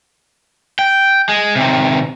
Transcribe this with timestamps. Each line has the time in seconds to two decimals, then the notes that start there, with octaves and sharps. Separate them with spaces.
0.79 G5
1.29 G#3
1.56 C3 D#3